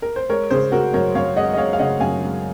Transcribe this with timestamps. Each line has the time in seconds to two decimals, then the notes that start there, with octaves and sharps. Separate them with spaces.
0.02 A#4
0.16 C5
0.30 G#3 A#4 C#5
0.51 C#3 G#4 C5
0.72 C#3 F#4 A#4
0.93 F#2 A#4 C#5
1.15 F#2 C#5 F5
1.36 G#3 D#5 F#5
1.53 D#5
1.58 G#3 C#5 F5
1.73 F5
1.79 C#3 D#5 F#5
2.00 F#2 F5 G#5
2.22 G#3